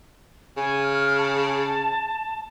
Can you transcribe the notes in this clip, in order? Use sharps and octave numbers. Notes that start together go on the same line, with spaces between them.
C#3 G#5
F6
A5